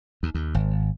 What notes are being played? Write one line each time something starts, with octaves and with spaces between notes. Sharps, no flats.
D#2
D#2
G#1